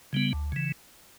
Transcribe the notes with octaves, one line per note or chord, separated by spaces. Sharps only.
C#3 G3 B3
D2
C#3 E3